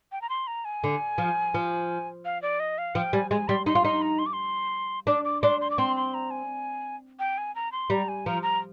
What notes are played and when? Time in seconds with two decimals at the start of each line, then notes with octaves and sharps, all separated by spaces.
0.12 G5
0.22 A#5
0.29 C6
0.47 A#5
0.65 G#5
0.84 D3
1.18 F3
1.54 F3
2.25 F5
2.42 D5
2.60 D#5
2.78 F5
2.95 F3 G5
3.13 G3 G#5
3.31 G#3 G#5
3.48 G3 C6
3.66 D#4 C6
3.75 F4
3.84 D#4 C6
4.02 A#5
4.19 C6
4.26 D6
4.33 C6
5.07 D4 D6
5.25 D6
5.42 D4 C6
5.61 C6
5.70 D6
5.78 C4 C6
5.96 C6
6.14 A#5
6.31 G#5
7.19 G5
7.38 G#5
7.56 A#5
7.72 C6
7.90 G3 A#5
8.08 G#5
8.26 F3 A#5
8.43 A#5